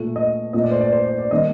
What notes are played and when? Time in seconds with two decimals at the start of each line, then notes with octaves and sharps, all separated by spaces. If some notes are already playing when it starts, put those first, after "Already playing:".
Already playing: A#2 A3
0.16 D#5
0.53 A#2 A3 D#5
0.64 D5
0.71 C5
0.81 D5
0.93 C5
1.06 D5
1.18 D5
1.31 D#3 G3 A#3 D#5